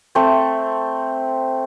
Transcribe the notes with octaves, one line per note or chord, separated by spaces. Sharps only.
A3 C4